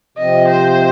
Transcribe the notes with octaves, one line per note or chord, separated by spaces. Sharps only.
C3 F3 C4 D#5
C5